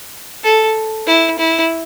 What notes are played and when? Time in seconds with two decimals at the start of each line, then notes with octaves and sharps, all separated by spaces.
0.43 A4
1.07 E4
1.38 E4